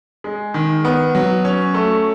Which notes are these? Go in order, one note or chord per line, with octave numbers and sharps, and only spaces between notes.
G#3
D#3
B3
F#3
C#4
A3